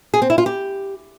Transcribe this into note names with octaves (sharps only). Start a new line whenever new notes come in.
G#4
C4
E4
F4
G4